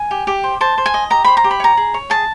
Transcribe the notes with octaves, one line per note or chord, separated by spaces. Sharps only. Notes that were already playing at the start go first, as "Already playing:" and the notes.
Already playing: G#5
G4
G4
C5
C5 A5
C5
G#5
D#5
G4 A#5
C5 B5
A#5
G4
B5
C#5 A#5
G#4
C#5
G#4 A5